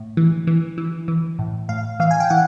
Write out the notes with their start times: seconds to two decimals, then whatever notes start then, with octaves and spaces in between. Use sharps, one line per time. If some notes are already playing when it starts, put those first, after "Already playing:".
Already playing: A2
0.17 E3
0.47 E3
0.78 E3
1.08 E3
1.39 A2
1.69 A2 F5
2.00 E3 F5
2.11 G#5
2.20 G5
2.30 E3 F#5